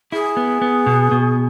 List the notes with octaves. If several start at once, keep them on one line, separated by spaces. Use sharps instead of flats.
E4 G#4
B3
B3
B2
B2